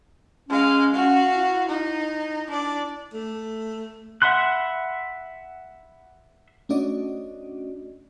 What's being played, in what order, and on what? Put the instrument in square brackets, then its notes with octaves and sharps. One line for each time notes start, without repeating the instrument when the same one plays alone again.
[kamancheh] G#3 F5 [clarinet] C#4
[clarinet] C#4 [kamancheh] F#4 F5
[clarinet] E4
[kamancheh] D#4
D4 D5
[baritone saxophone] A3
[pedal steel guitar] E5 F#5 B5 C6 F#6
[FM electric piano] A3 C#4 D4 F#4 D5 D#5